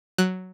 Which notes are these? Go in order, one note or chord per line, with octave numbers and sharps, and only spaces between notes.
F#3 F#6